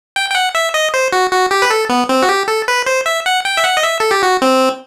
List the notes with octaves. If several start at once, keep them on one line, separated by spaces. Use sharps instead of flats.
G5
G5
F#5
E5
D#5
C5
F#4
F#4
G4
B4
A4
B3
C4
F#4
G4
A4
B4
C5
E5
F#5
G5
E5
F#5
D#5
E5
A4
G4
F#4
C4